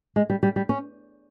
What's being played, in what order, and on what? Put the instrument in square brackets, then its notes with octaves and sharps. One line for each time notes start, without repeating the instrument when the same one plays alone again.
[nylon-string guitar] G#3
G3
G3
G3
C#4